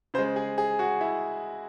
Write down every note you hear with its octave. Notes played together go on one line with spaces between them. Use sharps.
C#3 G#3 C5
G#4
G#4
F#4
E4